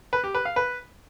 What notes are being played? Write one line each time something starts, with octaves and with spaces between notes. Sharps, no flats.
B4
G4
B4
F5
B4